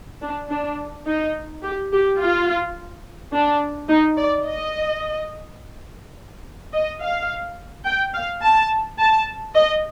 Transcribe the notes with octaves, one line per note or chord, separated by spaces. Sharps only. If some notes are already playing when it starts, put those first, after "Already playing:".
D4
D4
D#4
G4
G4
F4
D4
D#4
D5
D#5
D#5
F5
G5
F5
A5
A5
D#5